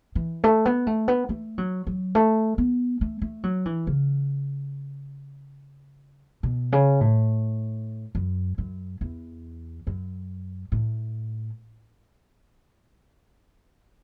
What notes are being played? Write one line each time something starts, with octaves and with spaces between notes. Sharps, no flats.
E3
A3
B3
A3
B3
A3
F#3
F#3
A3
B3
A3
A3
F#3
E3
C#3
B2
C#3
A2
F#2
F#2
E2
F#2
A2